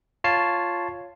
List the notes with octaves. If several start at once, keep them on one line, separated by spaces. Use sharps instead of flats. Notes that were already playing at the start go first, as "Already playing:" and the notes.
F4 C#5 A5 C7